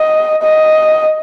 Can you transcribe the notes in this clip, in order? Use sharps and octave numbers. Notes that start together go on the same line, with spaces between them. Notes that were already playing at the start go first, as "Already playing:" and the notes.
Already playing: D#5
D#5